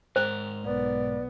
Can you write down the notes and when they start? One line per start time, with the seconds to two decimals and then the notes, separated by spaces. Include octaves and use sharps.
0.16 G#2 A#4 C5
0.65 B1 B3 D5